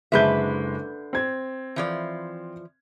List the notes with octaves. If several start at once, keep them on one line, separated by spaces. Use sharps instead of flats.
F#1 D3 G#3 B4 E5 G6
C4 G#6
E3 F3 D5